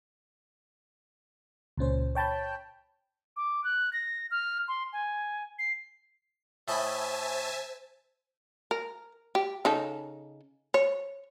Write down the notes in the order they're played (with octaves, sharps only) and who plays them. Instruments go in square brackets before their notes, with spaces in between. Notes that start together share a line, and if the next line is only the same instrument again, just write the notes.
[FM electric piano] C#2 A#2 C#4 C5
C#5 G5 A5 B5 G6
[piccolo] D6
F#6
A#6
F6
C6
G#5
C7
[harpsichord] A2 D#5 B5 [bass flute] C5 [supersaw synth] E5 G#5 A5
[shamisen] A#4
G4
C#3 D#4 A4
C#5